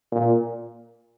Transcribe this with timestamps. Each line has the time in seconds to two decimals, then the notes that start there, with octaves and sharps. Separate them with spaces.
0.12 A#2